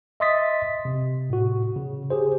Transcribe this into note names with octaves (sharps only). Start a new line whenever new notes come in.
D#5 E5 C6 D#6 A6 B6
C3
A2 F#4
C#3
G4 G#4 C5